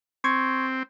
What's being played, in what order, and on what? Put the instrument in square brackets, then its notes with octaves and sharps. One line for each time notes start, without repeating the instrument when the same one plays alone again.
[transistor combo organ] C4 [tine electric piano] C6 C#6 G#6